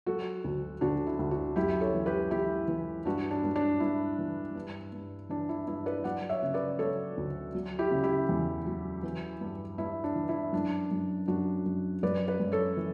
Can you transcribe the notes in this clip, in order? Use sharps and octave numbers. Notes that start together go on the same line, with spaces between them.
F#3 F#4 A4
D2
D2 D4 F#4
E4
D2
D4 F#4
F#2 E4 G4
A4 C#5
E3
G4 B4
E3 E4 G4
E3
G2 D4 F#4
D4
G2
D4
G2 E4
E3
G2
G2
E3 D4
E4
G2 E4
B4 D5
F#3 D5 F#5
C#5 E5
C#3
B4 D5
F#3 A4 C#5
D2
F#3
E4 G4
C#3
E4 G4
E2
F#3
E3
G2
G2 E4
D4
E3
E4
F#2 D4
F#2
F#2 D4 F#4
F#2
F#2 B4 D5
B4 D5
F#2
A4 C#5
E3